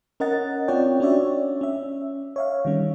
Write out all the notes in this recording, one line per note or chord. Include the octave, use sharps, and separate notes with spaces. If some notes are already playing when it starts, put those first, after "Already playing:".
C#4 A#4 D#5 F#5 A6
C4 C#4 F4 C#5 D5 G5
C#4 D4 F#4 C#5 D5 E5
C#4 E5
C#5 E5 F5
D#3 G3 C#4